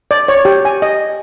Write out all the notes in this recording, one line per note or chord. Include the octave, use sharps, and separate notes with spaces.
D5
C#5
G4
G#5
D#5